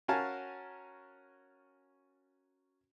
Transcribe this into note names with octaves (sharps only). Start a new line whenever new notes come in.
C#4 F#4 A#4 F5 G#5 A5